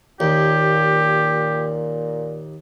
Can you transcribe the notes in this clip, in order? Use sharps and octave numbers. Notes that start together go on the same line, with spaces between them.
D#2 A#2 G4